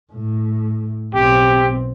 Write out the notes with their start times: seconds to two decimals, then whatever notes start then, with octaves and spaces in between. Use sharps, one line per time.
0.13 A2
1.14 B1 C4 G4